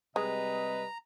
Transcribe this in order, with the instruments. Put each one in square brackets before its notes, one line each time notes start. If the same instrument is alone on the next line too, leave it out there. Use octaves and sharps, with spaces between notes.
[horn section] C3 G3 D#5 [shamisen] G#3 [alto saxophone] B4 [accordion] A#5